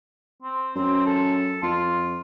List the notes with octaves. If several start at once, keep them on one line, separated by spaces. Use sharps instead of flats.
C4
F#2 C4
A4
F2 F4